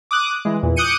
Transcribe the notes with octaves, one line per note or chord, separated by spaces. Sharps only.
D6 D#6 F#6
E3 G#3
E2 A#2 E3
D6 D#6 F#6 G6 C#7 D#7